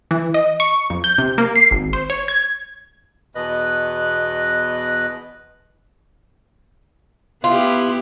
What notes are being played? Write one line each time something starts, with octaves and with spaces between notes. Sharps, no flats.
E3
D#5
C#6
F2
G6
C3
A#3
C7
G#1
C5
C#5
G#6
E2 B2 B4 D#5 F#6
B3 E4 F4 G4